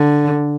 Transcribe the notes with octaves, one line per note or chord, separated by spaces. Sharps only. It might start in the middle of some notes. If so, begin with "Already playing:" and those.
Already playing: D3